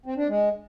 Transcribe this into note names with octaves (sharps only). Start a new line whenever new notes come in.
C4
D4
G#3